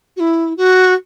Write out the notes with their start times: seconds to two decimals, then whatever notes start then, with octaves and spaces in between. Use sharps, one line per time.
0.16 F#4
0.20 E4
0.57 F#4